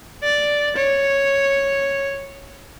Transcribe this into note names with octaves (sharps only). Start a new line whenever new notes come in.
D5
C#5